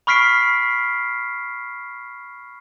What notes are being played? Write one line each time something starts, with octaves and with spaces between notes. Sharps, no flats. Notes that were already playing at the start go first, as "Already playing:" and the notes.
B5 C#6 F6 B6 C7 D7